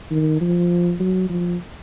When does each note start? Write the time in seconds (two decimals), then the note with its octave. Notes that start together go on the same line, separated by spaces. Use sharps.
0.11 D#3
0.41 F3
0.99 F#3
1.29 F3